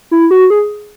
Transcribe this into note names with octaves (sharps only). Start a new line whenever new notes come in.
E4
F#4
G#4